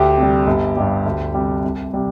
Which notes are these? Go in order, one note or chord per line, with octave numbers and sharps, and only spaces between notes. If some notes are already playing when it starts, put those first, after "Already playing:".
Already playing: D2 G4
C3 G3
G1
G2 G3
D2
C3 G3
C2
C3 G3